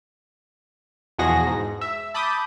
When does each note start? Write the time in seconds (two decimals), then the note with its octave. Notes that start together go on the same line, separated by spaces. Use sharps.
1.19 E2 B2 F3 F#4 G#4 A#6
1.47 G#2
1.81 E5
2.14 A5 B5 D6 D#6 G6